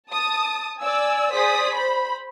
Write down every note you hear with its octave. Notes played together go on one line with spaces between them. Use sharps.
A5 D#6
D5 G#5 E6
G#4 C5 D5 D#6 B6
C5 B5